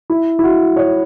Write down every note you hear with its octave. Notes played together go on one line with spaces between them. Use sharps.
E4
E4
F#4
C#5